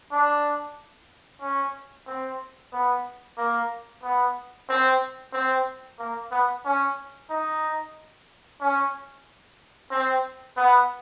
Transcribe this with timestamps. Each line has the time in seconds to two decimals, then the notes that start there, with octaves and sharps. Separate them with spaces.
0.12 D4
1.41 C#4
2.07 C4
2.72 B3
3.37 A#3
4.03 B3
4.69 C4
5.33 C4
5.99 A#3
6.31 B3
6.65 C#4
7.30 D#4
8.61 C#4
9.91 C4
10.57 B3